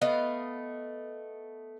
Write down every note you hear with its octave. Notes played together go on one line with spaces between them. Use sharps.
A3 B3 D#5 F5